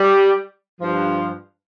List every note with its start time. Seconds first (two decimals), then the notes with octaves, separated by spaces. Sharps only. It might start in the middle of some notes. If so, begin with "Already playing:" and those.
Already playing: G3
0.81 G2 F3